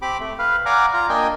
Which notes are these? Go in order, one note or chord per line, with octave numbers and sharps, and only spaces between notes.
C4 G4 B5 D6
A3
B4 F5
D5 F5 F#5 G#5 A#5 D6
F4 A#5
A#3 D4 D#5 G5 G#5